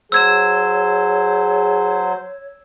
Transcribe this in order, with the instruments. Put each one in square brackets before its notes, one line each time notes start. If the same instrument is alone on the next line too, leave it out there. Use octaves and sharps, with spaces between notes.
[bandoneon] F#3 C5 [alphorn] G#4 [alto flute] C#5 [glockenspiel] E6 G#6 E7